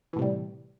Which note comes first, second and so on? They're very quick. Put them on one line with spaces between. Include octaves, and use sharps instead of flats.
E3 A2 C3 G3